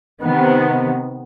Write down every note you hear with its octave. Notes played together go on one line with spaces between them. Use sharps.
C3 D#3 B3